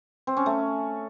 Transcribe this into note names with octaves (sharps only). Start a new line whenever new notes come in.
C4
C#4
A3